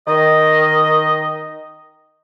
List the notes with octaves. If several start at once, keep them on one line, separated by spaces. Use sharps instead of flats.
D#3 D#5